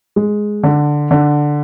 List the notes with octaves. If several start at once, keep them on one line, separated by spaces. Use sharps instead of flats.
G#3
D3
D3